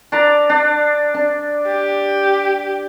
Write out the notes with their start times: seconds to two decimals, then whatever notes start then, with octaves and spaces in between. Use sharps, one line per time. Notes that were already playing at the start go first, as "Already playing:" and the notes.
0.12 D4 D5 A#5
0.49 D4
1.14 D4
1.67 G4